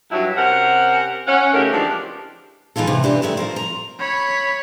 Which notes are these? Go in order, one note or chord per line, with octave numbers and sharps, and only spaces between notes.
G2 F#3 E4
C3 C#4 A#4 C5 F#5
C#4 F#5
C#3 A3 D#4 G4 A#4
E3 F3 G#3 C4 D4 G4
E3 G#3 D#4 F4 A4
C3 E3
E3 D4 G4 G#4 B4
G#2 D#3 A3 E4 E5
F3 A#4 C5
A#5
C#5 B5